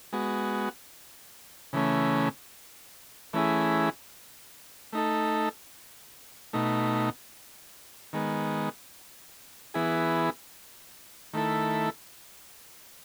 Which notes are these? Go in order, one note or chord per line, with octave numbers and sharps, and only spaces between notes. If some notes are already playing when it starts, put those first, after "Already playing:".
G#3 B3 F#4
C#3 E3 A3 C#4
E3 A3 C#4 E4 G#4
A3 D#4 A4
B2 A3 D#4
D#3 G#3 B3
E3 B3 E4 G#4
D#3 A3 E4 A4